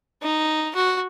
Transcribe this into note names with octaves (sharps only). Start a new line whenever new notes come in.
D#4
F#4